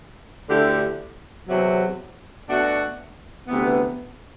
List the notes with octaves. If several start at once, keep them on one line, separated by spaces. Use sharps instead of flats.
D2 D3 A3 E4 G4
E2 C3 F#3
B2 A3 D4 F#4
D2 C3 E3 B3